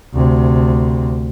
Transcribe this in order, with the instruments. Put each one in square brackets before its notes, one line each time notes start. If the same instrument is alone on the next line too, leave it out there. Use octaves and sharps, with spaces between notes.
[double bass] D2 C3